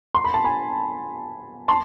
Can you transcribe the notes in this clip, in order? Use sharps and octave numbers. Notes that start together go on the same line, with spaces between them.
C6
B5
A5
G#5 B5
A5 C6